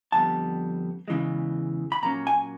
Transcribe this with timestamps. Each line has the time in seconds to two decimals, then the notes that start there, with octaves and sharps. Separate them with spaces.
0.12 F2 D3 G3 B3 A5
1.08 E2 C#3 E3 G#3
1.92 B5
2.02 A#2 F#3 A#3 C#4 A#5
2.27 G#5